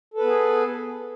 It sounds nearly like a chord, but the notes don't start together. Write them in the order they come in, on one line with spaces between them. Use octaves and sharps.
A4 B4 B3 G#4